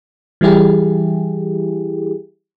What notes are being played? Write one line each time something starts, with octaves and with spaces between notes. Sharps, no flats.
E3 G3 E4 G4 G#4